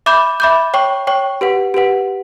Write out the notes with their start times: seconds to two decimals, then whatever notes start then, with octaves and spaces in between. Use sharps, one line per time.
0.06 E5 B5 D6 G6
0.40 E5 B5 D6 G6
0.74 C#5 G5 C#6
1.07 C#5 G5 C#6
1.41 G4 B4 F#5
1.74 G4 B4 F#5